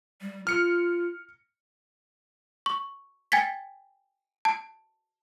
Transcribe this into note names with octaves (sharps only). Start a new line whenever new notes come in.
G3
F4 F6 C#7
C#6
G5 G#5 G#6 A6 B6
A5